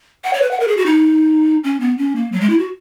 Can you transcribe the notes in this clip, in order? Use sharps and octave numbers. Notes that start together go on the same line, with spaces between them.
F#5
C#5
B4
F#5
A#4
G#4
F#4
D#4
C#4
B3
C#4
A#3
F#3
G#3
E4
F#4